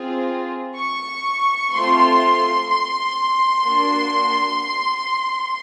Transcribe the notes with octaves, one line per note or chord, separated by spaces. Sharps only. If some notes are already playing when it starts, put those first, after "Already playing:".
Already playing: C4 F4 G#4
C#6
A3 C4 F4 A4 C6
C6
A#3 D4 F#4